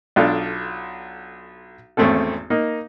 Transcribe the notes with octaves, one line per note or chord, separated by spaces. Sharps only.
B1 D4 F4 A4
G#1 E2 A3 C4 C#4 A4
A#3 D#4